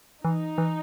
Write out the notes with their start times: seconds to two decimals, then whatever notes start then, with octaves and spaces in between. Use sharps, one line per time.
0.24 E3 D#4
0.58 E3